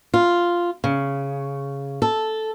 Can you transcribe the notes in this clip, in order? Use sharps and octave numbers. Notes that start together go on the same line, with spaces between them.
F4
C#3
A4